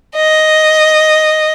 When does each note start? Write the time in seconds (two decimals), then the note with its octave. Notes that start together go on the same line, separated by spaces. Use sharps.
0.17 D#5